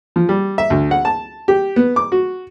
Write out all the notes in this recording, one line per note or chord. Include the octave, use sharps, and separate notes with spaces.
F3
G3
E5
D2
F#5
A5
G4
B3
D6
F#4